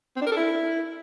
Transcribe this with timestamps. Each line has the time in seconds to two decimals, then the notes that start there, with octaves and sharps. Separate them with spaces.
0.16 C4
0.21 D4
0.27 A#4
0.32 A4
0.37 E4